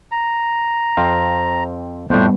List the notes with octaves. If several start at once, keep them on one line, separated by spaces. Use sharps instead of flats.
A#5
F2 C4 F5
F2 A2 G3 B3 D4 C5